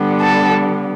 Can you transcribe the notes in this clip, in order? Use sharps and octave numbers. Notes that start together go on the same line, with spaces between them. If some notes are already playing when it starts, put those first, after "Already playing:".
Already playing: D3 G3 B3
A4